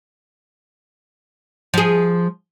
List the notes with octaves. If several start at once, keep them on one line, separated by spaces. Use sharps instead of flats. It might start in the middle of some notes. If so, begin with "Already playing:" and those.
F3 G#4